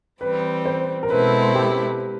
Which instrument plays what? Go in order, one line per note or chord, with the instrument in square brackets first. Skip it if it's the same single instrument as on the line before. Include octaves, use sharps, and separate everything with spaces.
[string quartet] E3 G3 C4 [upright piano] B4
[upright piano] C5
A#4
[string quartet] B2 G#3 C4 E4 A4 [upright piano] B4
[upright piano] G4